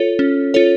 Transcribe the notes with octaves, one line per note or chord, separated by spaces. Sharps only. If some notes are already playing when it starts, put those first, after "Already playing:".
Already playing: F4 A4 C#5
C#4
F4 A4 C#5